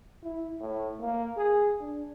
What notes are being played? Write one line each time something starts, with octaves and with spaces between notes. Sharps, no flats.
E4
A2
A#3
G#4
D4